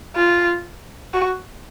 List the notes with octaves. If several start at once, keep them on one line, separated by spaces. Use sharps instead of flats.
F4
F#4